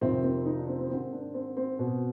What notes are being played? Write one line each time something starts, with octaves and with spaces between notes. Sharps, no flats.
F2 C3 D#3 C4
C4
D#4
D4
C4
C4
G#2 D#3 C4
D4
C4
C4
B2